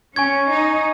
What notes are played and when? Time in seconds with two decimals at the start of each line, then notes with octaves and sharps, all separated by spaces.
0.16 C#4 G#5 C#6 G#6
0.51 D#4